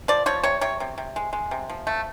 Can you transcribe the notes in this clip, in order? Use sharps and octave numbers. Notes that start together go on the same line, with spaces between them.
F3 D5
F3 C#5
C3 C#5
C3 C#5
C3
C3
G#3
G#3
C3
F3
A3